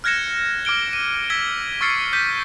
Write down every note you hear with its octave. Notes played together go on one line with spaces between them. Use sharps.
F6 F#6 G#6 A#6 C#7 E7
D6 F6 D7 G7
D#7
E6 G#6 B6 G7
C#6 E6 F6 A6 C7 C#7
D6 G6 B6 D#7